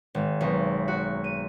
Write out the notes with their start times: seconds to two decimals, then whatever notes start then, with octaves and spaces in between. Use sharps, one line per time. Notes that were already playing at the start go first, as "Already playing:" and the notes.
0.15 G#1
0.41 B1
0.88 F#4
1.24 D#7